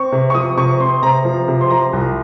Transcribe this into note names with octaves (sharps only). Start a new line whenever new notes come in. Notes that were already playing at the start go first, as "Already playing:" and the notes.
Already playing: C4 C#6
C3
C#6
F3 D#6
C3 C#6
C4 C6
C3 A#5
F3
C3
C6
F3 A#5
C2